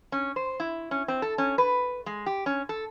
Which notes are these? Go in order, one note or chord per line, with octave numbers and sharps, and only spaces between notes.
C#4
C5
E4
C#4
C4
A4
C#4
B4
G#3
G4
C#4
A4